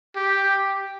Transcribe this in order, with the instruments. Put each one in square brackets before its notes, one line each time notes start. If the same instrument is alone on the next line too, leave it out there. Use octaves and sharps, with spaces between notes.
[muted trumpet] G4